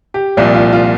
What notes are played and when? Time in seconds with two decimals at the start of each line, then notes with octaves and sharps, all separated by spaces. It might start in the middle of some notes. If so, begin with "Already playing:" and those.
0.14 G4
0.37 C2 A#2 F3 F4
0.55 F4
0.73 F4